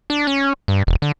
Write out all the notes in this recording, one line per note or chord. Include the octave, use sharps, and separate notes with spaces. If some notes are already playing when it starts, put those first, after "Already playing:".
D4
C#4
G2
E1
D3